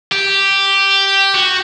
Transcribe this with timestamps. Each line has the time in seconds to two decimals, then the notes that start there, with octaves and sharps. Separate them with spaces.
0.12 G4
1.34 F#4